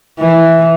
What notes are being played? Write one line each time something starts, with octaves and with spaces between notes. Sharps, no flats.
E3